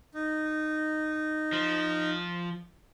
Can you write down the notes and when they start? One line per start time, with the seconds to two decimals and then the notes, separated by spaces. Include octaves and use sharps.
0.14 D#4
1.53 F3